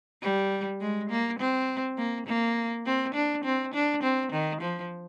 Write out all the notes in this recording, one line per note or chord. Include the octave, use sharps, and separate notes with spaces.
G3
G#3
A#3
C4
A#3
A#3
C4
D4
C4
D4
C4
D#3
F3